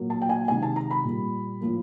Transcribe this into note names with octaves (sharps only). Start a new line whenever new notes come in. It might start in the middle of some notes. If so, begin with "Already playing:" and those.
Already playing: A#2 F#3 A#3
A5
G5
G#5
C3 D#3 G#3 G#5
A5
A#5
B5
A#2 G3 A#3
A2 F3 A#3